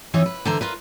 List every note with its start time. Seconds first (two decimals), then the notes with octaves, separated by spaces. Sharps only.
0.14 F2 E3 D#4 F4 C#5
0.26 B4
0.45 D3 E3 C5 D5 A#5
0.61 F4 A#4 B4